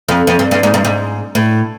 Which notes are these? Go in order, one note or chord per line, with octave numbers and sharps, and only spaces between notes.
F2
F2
G2
G2
G#2
G2
G#2
A2